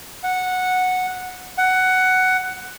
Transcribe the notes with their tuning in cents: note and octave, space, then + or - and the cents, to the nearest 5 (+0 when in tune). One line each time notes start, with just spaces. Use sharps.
F#5 -10
F#5 +10